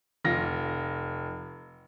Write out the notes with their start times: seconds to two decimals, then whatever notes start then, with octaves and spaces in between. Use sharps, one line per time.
0.24 F1 F4 A#6